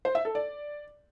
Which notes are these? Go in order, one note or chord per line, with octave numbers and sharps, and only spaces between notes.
C5
E5
A4
D5